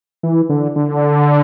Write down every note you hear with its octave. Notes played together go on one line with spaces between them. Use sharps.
E3
D3
D3